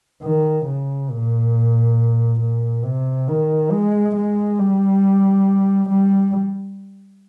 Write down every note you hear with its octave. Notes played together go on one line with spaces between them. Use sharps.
D#3
C#3
A#2
A#2
C3
D#3
G#3
G#3
G3
G3